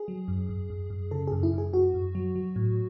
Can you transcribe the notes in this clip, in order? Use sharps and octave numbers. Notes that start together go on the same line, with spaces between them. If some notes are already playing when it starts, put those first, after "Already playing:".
Already playing: G#4
F#3
F#2
F#2
F#2
F#2
C#3 A4
F#2 G#4
E4
F#2 G#4
F#2 F#4
F#2
F#3
F#3
A2